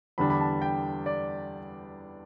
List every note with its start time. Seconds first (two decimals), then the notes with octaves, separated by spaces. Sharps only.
0.18 E2 D3 G3 D4 B5
0.30 B5
0.41 A5
0.62 G5
1.06 D5